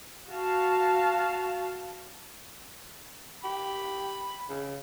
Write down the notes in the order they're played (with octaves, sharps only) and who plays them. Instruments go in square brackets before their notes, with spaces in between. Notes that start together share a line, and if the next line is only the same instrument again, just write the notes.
[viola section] F#4 F5 A5
[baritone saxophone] G4 [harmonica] B5
[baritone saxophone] C#3